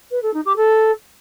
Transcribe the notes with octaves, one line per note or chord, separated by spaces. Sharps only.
B4
A4
D#4
G4
A4